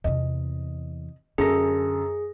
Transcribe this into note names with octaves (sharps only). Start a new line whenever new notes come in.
E2 C3 D#5
F#2 D3 G#4 A4 A#6